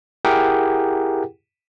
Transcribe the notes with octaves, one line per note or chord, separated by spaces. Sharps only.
E4 G4 G#4 A#4 F#5 G5